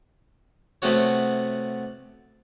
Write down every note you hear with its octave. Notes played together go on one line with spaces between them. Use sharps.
C3 A3 B3 F#4 C#5